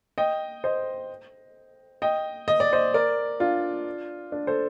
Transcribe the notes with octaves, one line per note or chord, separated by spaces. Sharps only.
D#5 G5
C5 D#5
D#5 G5
D#5
D5
C5 D#5
A#4 D5
D4 F4
D4
A4 C5